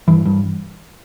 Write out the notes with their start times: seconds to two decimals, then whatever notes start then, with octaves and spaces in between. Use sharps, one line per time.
0.08 G2 E3
0.25 G2